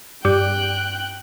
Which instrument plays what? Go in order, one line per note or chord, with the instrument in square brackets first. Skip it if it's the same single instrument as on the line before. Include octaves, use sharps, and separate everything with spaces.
[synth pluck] G2 [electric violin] G5 F#6